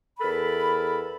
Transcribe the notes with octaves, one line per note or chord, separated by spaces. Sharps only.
E2 A4 A#4 B5